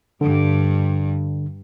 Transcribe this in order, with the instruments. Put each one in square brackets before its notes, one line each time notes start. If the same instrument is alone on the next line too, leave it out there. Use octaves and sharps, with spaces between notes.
[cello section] G2 [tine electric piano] D3